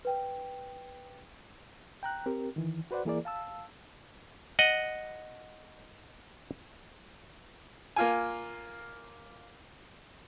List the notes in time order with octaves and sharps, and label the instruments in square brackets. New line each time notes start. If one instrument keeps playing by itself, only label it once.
[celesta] B4 G5
[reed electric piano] G5 A#5 F#6
C4 G4 A#4
D#3 E3
F#4 B4 C5 D5 F#5
E3 A#3 E4 G#4 A#4 D5
F5 A5 E6
[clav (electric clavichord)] D#5 F#5
[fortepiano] A#3 F4 G#5